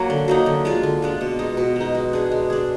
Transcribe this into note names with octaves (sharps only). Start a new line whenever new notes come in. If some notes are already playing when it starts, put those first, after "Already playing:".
Already playing: F#3 A#3
D3
F#3 A#3 D#4
D3
G#3 D4 F4
D3
G#3 D4 F4
B2
G#3 D#4
B2
G#3 D#4
G#3
D4 G#4
G#3
D4 G#4